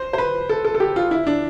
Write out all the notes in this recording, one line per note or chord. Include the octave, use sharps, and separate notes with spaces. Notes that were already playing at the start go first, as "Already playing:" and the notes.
Already playing: C5
C5
B4
A4
A4
A4
G4
F4
E4
D4